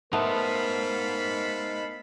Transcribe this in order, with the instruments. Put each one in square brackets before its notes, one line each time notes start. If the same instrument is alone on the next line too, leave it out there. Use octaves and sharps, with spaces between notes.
[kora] A3 B3 [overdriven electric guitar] D#4 C5 [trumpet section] A4 F5 B5 [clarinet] A#4